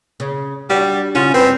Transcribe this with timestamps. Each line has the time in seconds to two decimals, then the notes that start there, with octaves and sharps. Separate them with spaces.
0.20 C#3
0.70 G3 D4 F#4
1.15 C#3 C#4 F4 F#4
1.34 G2 C4 B4